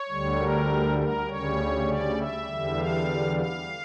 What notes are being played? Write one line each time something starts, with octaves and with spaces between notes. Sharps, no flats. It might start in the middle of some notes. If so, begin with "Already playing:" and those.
Already playing: C#5
D2 D3 G3
A#4
A#4
D2 C#3 G3 C#5
D5
E5
E2 D3 G3
F5
F5